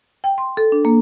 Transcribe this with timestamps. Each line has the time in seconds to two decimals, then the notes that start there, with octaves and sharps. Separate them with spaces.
0.24 G5
0.38 C6
0.57 A4
0.72 D4
0.85 A#3